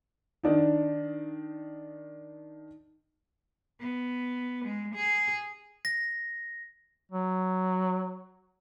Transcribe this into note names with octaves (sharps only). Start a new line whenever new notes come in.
D#3 D4 D#4
B3
G#3
G#4
A#6
F#3